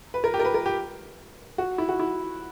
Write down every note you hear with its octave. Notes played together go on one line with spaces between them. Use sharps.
B4
A#4
G4
A#4
B4
A#4
G4
F#4
E4
F#4
E4